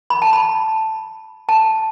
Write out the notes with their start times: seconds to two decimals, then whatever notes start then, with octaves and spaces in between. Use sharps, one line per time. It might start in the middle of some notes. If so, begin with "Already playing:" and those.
0.10 B5
0.22 A5
0.33 B5
1.49 A5